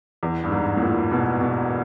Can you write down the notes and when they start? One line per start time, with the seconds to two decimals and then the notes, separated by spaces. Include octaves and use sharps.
0.23 E2
0.44 G2
0.52 G#2
0.77 A2
0.82 A#2
1.11 B2
1.41 B2